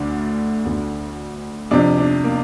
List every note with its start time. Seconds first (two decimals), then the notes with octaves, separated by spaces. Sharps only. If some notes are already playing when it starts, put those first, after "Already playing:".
Already playing: D2 D3 D4
0.65 D2 D3
1.71 F2 C3 D4
1.98 D4
2.24 A#3